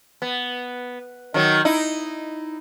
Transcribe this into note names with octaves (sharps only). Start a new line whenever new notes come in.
B3
D#3 F#3
D#4 E4